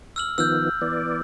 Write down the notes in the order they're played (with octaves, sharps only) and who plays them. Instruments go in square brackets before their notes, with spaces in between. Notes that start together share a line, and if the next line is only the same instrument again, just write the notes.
[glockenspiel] E6 F6 F#7
[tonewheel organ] D#3 F3 B3 [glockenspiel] E6 F6 G6
[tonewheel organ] E3 B3 D5